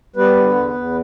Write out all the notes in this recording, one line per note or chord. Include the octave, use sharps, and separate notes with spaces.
G3 B3 B4
D3
E2
E2